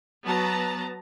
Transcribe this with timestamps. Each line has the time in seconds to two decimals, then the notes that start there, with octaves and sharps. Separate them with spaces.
0.25 F#3 B3 A5 A#5